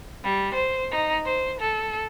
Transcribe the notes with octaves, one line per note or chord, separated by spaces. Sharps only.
G3
C5
D#4
C5
A4